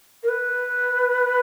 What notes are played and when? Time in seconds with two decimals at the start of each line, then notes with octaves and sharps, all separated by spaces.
0.23 A#4
0.28 B4